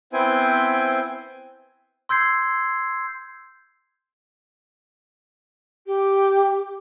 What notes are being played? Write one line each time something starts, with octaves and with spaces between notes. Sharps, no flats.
B3 C4 E4 C5 G5 G#5
C6 E6 G6 G#6 C7
G4